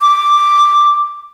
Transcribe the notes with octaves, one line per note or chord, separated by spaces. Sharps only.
D6